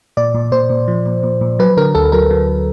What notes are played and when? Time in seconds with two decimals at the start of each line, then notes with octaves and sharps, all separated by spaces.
0.17 A#2 D5
0.34 A#2
0.52 A#2 C5
0.70 A#2
0.88 F3
1.06 A#2
1.23 A#2
1.41 A#2
1.59 F#3 B4
1.77 D3 A#4
1.95 D2 A4
2.12 F#3 A#4
2.31 F#3